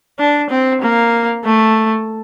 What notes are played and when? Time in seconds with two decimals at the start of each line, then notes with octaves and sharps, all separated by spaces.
0.19 D4
0.50 C4
0.81 A#3
1.45 A3